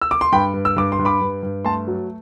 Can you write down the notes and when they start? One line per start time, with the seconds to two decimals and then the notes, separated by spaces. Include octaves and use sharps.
0.02 E6
0.11 D6
0.21 C6
0.32 G2 G5 B5
0.54 G2
0.65 E6
0.76 G2 D6
0.92 C6
0.99 G2
1.05 B5 D6
1.21 G2
1.43 G2
1.65 A3 A5 C6
1.88 F#3